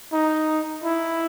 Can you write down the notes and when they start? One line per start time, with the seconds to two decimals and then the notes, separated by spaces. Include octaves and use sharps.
0.13 D#4
0.84 E4